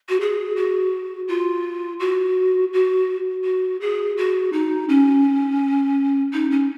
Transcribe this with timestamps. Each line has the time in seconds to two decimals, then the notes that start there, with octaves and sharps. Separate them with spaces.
0.09 F#4
0.20 G#4
0.56 F#4
1.28 F4
2.00 F#4
2.73 F#4
3.44 F#4
3.81 G#4
4.17 F#4
4.52 D#4
4.89 C#4
6.33 D#4
6.51 C#4